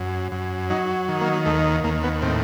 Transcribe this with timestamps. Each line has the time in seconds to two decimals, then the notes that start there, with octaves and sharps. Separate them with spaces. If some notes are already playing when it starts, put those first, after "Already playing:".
Already playing: F#2
0.32 F#2
0.70 F#3 D#4
1.08 D#3
1.21 A#3
1.45 D#2 A3
1.84 D#2 A#3
2.03 B3
2.22 A2 C4